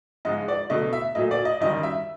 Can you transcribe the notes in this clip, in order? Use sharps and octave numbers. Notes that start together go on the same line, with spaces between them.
G#2 F3 G#3 D#5
D5
B2 F#3 A3 D#5
E5
A#2 F#3 A3 D#5
D5
D#5
F#2 D#3 G3 D#5
E5